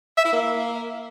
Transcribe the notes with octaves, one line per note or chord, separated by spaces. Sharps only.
E5
E4
A#3